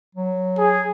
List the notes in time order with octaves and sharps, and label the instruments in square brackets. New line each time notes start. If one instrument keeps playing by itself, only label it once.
[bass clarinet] F#3
[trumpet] G#4